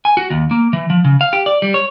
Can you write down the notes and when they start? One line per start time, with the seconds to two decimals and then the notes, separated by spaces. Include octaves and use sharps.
0.05 G#5
0.17 F#4
0.30 D#2
0.51 A#3
0.73 E3
0.90 F3
1.05 C#3
1.21 F5
1.33 G4
1.46 D5
1.62 G3
1.74 C#5